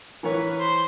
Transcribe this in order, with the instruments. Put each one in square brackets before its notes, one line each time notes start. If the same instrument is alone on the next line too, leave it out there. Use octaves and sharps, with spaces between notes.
[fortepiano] E3 A#4 C#5 [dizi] B4
[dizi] C5